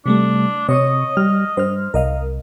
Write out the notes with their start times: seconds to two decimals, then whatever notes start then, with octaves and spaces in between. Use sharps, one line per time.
0.06 C3 G3 A3 D4
0.69 C3 C#5 D#5 C#6 D#6
1.17 G3 F6
1.57 G2 C5 F6
1.94 C2 A#4 D#5 F5